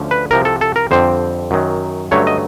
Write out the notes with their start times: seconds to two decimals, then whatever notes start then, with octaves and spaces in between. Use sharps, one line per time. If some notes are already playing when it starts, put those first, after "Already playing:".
Already playing: D2 D3 F3 A3 C#4
0.11 B4
0.31 C2 C3 F3 A#4
0.45 A4
0.61 A4
0.76 A#4
0.91 F2 D3 G3 C4 C5
1.51 F#2 D#3 F#3
2.11 G2 D3 F#3 A3 C#4 C#5
2.27 D#5